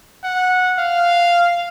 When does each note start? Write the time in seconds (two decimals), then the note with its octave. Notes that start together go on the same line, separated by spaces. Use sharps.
0.24 F#5
0.79 F5